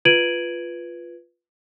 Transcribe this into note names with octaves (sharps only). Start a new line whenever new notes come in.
F4 B4 G#6 D7 D#7 F#7